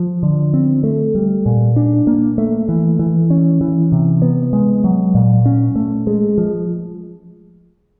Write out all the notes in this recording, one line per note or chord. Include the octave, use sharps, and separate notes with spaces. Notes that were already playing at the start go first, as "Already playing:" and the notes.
Already playing: F3
D3
C4
A3
G3
A#2
D4
A#3
A3
E3
E3
C#4
E3
C3
B3
G#3
F#3
A#2
C#4
A3
G#3
F3